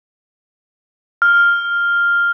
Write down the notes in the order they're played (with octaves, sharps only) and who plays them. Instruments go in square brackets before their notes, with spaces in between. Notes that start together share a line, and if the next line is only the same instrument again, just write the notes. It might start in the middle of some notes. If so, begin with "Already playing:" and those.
[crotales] F6